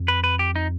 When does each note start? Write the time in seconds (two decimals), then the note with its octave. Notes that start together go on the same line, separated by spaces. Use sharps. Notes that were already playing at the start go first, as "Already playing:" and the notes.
Already playing: F2
0.08 B4
0.24 B4
0.39 G4
0.56 D#4